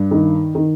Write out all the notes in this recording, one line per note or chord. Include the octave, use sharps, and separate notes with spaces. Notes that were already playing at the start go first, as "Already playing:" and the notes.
Already playing: G2
D#3
D#3